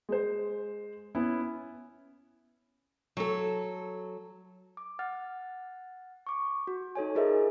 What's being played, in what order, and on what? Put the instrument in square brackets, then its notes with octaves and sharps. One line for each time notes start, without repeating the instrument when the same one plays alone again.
[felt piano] G#3 C5
B3 C#4 E4
[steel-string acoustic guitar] F#3 A4
[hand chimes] D6
F#5 F6 A6
C#6 D6
F#4
D#4 A4 C#5 G#5
F4 G#4 A#4 C5 D#5 E5